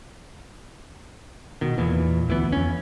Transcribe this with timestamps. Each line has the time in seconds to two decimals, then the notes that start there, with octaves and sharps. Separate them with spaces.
1.61 B2 D#3
1.78 E2 A#2 E3
2.28 D2 E3 B3
2.52 F2 C#4